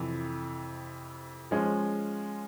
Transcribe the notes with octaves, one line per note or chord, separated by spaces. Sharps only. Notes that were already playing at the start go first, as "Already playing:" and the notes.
Already playing: F2 C3 E3
F3 G#3 C#4